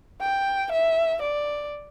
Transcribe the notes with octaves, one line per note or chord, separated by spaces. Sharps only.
G5
E5
D5